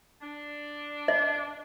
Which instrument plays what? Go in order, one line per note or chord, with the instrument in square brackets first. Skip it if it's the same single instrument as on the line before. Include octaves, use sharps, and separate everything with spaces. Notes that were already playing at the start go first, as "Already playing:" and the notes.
[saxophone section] D4
[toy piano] D#5